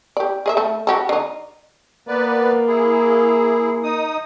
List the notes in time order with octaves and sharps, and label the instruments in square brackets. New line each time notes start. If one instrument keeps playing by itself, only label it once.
[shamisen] G4 D5
G#4 D#5 E5
A3 A4
F#4 G4 A4
D3 D#4
[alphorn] A#3 [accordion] B3 B4 D5
[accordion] E4 G#4
D#4 D#6